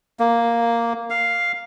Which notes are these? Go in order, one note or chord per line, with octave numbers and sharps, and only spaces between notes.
A#3
F5